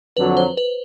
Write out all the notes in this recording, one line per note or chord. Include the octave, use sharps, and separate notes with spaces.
F2 D3 F#3 B4
C5
B4